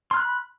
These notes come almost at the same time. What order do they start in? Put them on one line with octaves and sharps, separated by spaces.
C6 F6 F#6 B5